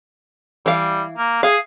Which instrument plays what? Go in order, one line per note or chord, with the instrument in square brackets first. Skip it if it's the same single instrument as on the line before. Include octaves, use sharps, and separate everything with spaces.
[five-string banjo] E3 F5 [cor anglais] G3
[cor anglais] A#3
[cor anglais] G#4 [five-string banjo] F5